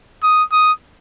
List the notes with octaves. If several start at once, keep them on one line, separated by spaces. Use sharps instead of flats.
D#6
D#6